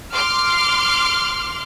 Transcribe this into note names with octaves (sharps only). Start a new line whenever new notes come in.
C6 D6 F6